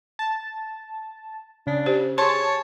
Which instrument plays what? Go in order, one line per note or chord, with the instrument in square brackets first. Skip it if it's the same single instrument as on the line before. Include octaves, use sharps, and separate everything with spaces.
[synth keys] A5
[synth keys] C#3 [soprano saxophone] D4
[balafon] G4 C5
[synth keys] G#4 A5 [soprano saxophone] C#5 [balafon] C6